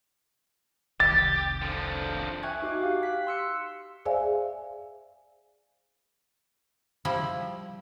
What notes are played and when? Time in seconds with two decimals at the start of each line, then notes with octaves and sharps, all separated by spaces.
1.00 F1 C2 D#3 G4 A6
1.62 D3 F3
2.43 E5 G5 G#5 C#6 F#6 G#6
2.62 D#4 F#4 D6
2.81 G4 F5 G5
3.03 F#6 B6
3.27 C6 E6 C#7
4.05 G#4 C5 D5 E5 F5 G#5
7.05 F3 G3 E4